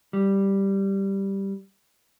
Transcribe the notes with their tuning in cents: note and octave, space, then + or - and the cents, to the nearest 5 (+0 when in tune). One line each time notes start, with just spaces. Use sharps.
G3 +0